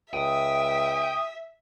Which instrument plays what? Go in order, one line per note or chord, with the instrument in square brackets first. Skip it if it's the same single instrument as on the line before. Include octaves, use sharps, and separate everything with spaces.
[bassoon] C#2 [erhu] E5 [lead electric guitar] G5 [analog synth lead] D#6